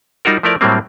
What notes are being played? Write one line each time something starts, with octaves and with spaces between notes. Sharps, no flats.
G3 D#4 F4 F#4 A#4
F3 A3 E4 A#4 D5
A2 F#3 G3 A#3 C4